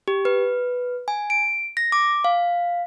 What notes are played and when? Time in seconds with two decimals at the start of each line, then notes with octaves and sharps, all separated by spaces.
0.08 G4
0.25 B4
1.08 G#5
1.30 D7
1.77 A#6
1.92 D6
2.24 F5